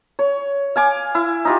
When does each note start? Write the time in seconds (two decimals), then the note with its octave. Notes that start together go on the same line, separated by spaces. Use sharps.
0.19 C#5
0.76 F5 G#5 D6
1.15 E4
1.45 D#4 F4 G4